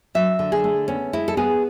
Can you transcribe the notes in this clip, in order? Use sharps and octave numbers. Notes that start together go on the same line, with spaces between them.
F#3 E5
D3
G#4
A3
B3 C#4
G#3 E4
A4
B3 G#4